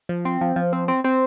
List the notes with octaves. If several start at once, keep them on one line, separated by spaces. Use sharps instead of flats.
F3
C4
F3
F3
C4
C4
C4